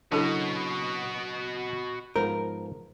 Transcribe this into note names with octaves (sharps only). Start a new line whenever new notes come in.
C#3 F#3 D4 E4 F#4 A4 A#4 D#5
G#2 F3 B3 A#4 C5